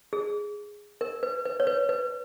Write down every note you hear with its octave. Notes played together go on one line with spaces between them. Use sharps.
G#4
A#4
B4
B4
C#5
B4
B4